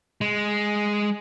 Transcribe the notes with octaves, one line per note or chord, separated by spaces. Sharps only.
G#3